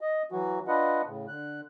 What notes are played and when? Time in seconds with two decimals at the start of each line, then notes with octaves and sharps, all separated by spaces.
0.01 D#5
0.32 E3 F#3 F#4
0.68 D4 F4 B4 D#5 F#5
1.06 A2 C#3
1.28 D3 F#6